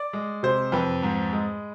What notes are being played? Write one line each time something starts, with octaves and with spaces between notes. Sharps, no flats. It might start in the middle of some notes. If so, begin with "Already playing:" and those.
Already playing: D5
G#3
C3 C5
F2 B4
G#2
G#3